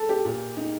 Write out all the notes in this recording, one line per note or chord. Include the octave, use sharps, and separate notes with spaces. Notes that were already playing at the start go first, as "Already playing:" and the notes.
Already playing: A4
G4
A#2
D#4